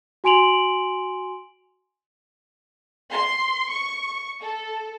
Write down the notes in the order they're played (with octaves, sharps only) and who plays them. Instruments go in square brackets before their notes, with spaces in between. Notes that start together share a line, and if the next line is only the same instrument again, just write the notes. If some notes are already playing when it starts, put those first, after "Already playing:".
[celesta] F#4 G#5 C6 D7 F7 F#7
[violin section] C6
C#6
A4